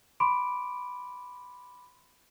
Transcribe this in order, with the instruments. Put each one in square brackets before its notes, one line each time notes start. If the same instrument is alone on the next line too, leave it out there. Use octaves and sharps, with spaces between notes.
[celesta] B5 C6 D6 D7